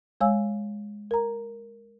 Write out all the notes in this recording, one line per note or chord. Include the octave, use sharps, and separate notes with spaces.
G#3 C#5 F5 G#5 E6
A#4 A#5